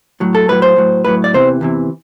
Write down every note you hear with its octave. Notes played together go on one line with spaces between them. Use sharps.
A2 F#3
A4
A2 F#3 B4
C5
A2 F#3
A2 F#3 B4
D5
E2 C3 E3 C5
E2 C3 E3